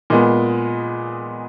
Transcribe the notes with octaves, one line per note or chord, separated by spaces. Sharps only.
A#2 G#3 B3